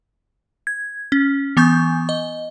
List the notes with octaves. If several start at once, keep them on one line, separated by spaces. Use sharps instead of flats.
G#6
C#4
E3 B3 G#5 C#6 G6
D#5